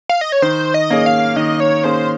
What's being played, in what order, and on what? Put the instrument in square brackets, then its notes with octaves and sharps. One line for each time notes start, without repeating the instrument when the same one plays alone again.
[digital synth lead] F5
D#5
C#5
[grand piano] D#3 [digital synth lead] C5
[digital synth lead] D#5
[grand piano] A#3 C#4 G#4
[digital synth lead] F5
[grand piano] D#3 [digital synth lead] D#5
[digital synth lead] C#5
[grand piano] A#3 C#4 G#4 [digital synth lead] C5